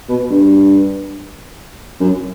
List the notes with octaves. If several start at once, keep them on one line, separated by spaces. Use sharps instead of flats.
B2
G2
F#2